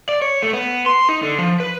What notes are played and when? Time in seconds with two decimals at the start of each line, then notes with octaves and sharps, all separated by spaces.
0.09 D5
0.22 C#5
0.42 A3
0.53 B3
0.86 C6
1.09 D#4
1.23 D3
1.39 F3
1.60 B4